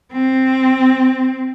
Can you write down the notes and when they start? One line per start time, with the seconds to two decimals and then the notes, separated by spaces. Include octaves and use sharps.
0.13 C4